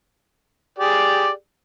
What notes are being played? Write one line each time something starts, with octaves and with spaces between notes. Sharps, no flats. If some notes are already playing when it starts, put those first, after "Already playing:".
G4 G#4 D5